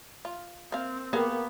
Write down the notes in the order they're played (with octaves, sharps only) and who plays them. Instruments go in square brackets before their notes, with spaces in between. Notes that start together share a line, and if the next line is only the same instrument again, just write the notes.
[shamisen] F4
[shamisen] A#3 F5 [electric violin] C4
[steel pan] A#3 G4 [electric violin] B3 [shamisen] G#4 A#4 F5